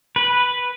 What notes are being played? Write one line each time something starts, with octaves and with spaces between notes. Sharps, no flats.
B4